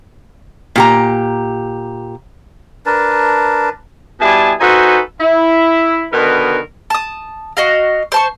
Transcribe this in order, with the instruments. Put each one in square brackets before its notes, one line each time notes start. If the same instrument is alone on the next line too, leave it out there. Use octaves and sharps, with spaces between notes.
[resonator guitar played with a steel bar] A#2 G4 A#5
[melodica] D4 A#4 B4 A5
[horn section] B2 G3 E4 G#4 G#5 A5
D#4 F#4 A4 B4 C5 G#5
E4
B2 D3 D#3 A#4 B4
[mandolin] A5 D#6
F#4 D#5 F5
C5 A5 C#6